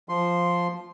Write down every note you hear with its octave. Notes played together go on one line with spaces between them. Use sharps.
F3 C6